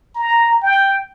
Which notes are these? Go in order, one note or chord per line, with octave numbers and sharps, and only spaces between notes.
A#5
G5